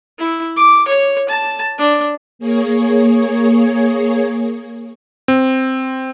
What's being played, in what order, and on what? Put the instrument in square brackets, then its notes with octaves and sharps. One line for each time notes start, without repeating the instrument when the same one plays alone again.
[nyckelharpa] E4
D6
C#5
A5
D4
[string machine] A#3 G#4 C#5
[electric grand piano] C4